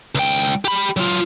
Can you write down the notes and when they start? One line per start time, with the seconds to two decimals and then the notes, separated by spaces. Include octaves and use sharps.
0.15 C#2 G5
0.65 G4 B5
0.97 F#3 F4